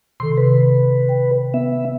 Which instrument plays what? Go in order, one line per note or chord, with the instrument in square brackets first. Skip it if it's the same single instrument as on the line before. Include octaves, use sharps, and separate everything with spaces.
[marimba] C3 D#3 A4 [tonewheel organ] C6
[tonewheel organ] B4
[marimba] G5
[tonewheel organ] B3 E5